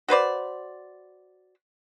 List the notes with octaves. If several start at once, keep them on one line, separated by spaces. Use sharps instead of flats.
F#4 B4 C5 D5